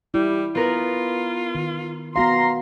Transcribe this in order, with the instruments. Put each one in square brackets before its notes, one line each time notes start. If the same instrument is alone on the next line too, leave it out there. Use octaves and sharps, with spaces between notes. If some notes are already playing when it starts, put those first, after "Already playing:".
[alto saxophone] G3 [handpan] E4
[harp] B3 A#4 B4 [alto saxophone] F4
[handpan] D#3
[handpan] B3 F#4 F5 [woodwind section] A#5 C6